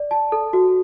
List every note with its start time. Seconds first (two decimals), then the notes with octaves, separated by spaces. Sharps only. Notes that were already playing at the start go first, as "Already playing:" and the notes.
Already playing: D5
0.11 A5
0.32 A4
0.53 F#4